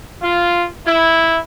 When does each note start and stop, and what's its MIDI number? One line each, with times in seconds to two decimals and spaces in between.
0.22 0.66 65
0.85 1.38 64